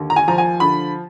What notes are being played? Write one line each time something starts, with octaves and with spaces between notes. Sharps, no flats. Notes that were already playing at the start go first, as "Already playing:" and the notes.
Already playing: D#2 D3
A#5
G#5
F3 A#5
G#5
D3 B5